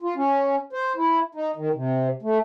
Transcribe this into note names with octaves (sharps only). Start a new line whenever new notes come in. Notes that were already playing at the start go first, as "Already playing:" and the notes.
F4
C#4
C5
E4
D#4
D#3
C3
A3